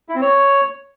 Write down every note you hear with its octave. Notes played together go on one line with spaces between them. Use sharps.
E4
C4
C#5